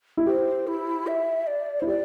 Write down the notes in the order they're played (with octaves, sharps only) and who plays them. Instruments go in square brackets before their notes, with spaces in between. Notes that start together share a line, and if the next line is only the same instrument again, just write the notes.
[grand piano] E4
[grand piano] G4 [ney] C5
[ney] E4
E5
D5
[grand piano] E4 [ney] C5
[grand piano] G4 [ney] D5